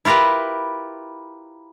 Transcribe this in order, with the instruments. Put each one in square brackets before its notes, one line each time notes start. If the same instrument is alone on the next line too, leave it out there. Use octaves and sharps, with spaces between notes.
[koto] E4 F4 G4 A#4 B4